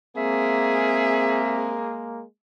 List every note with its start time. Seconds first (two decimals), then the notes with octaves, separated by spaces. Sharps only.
0.17 G#3 A#3 C4 G#4 E5